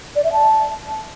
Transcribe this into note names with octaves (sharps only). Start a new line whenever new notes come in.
D5
E5
A5